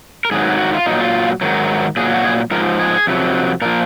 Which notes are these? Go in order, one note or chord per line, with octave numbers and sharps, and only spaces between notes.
A#4
G#2 D#3 F#3 G#4
F#4
F4
A#2 F#3 D#4
F4
G#2 D#3 F#3
A#2 F#3 G#4
F#4
G#4
G#2 F3 A#4
G#4
F2 C3 F#3
A#2 F3 A#4